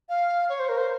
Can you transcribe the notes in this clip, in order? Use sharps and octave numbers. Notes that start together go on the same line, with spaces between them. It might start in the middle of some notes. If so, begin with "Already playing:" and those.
F5
C#5
C5
A#4
C5